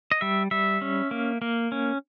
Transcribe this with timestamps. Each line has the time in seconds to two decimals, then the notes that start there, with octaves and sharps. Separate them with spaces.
0.12 D#5
0.21 G3 E5
0.51 G3 E5
0.81 C#4
1.11 A#3
1.42 A#3
1.72 C#4